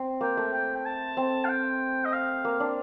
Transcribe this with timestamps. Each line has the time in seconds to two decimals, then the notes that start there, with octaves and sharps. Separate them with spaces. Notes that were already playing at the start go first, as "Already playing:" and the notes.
Already playing: C4
0.21 A#3 G5
0.37 A3
0.53 G5
0.75 G5
0.85 A5
1.17 C4
1.44 F5
1.49 G5
2.05 D#5
2.13 F5
2.45 A#3
2.60 D4